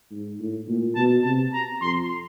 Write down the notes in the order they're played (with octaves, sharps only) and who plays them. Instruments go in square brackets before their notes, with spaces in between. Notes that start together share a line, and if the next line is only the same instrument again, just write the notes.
[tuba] G#2
A2
A#2
[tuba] B2 [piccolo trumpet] A5
[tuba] C3 [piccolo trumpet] A5
[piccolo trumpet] A#5
[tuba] F2 [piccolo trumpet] C6